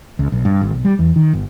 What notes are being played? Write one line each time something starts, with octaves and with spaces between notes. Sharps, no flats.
C#2
B1
G2
G#1
B1
G3
E2
D#3
G1